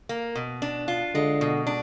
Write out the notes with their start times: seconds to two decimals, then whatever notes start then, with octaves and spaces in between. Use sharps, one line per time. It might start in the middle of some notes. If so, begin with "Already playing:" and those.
0.09 A#3
0.35 B2
0.62 D4
0.88 F4
1.14 D3 G#3
1.41 B2
1.67 D4